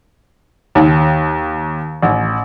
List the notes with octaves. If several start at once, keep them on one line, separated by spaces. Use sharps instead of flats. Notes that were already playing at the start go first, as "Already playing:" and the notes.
D#2
A1